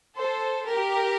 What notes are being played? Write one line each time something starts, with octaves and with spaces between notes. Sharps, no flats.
A4 C5
G4 A#4